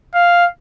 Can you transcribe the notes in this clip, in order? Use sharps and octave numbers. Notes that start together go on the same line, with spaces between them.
F5